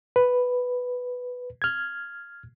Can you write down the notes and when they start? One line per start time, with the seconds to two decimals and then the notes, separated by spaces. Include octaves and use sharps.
0.16 B4
1.62 F6 G#6